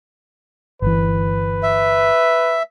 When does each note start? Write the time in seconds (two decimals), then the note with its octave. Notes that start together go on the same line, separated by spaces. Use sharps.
0.82 G1 E3 B4
1.63 E5